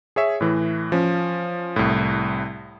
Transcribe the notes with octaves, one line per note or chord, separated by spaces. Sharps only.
G#4 C#5 E5
A2 E3
F3 C#4
C2 A2